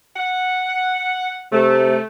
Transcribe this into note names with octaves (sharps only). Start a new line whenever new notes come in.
F#5
C3 A3